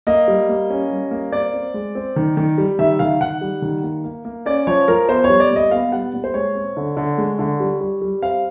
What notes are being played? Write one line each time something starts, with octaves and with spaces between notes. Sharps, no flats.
A#3 D#5
G3
A#3
C#4
G3
A#3
C4 D5
C4
G#3
C4
D#3
D#3
G3
D#3 E5
D#3 F5
D#3 F#5
G3
D#3
A#3
A#3
A#3
C#4 D5
F3 C#5
F3 A#4
B3 C5
C#5
G3
D5
A#2
D#5
B3 F5
G3 F#5
A#2
C5
G#3 C#5
C4
D3
D3
G#3
D3
G3
G3
G3
C4 F5